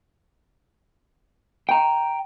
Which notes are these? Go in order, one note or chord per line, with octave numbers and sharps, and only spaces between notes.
G5 A#5